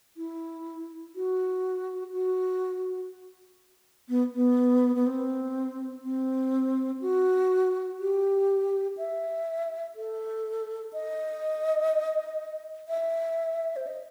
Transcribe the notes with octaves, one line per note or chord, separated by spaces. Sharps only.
E4
F#4
F#4
B3
B3
B3
C4
C4
F#4
G4
E5
A4
D#5
E5
C5
D#5